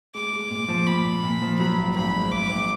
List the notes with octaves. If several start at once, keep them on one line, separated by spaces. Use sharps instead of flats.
G#3 D6
G#3
A#2
F3
A#2 B5
A#2
A#2
F3
F#3 B5
G#1
G#1 B5
G#2
G#1 D6
G#1